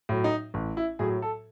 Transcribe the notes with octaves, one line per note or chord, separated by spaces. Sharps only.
A2 F#3
D#4
A1
E4
A2 F#3 G#4
A4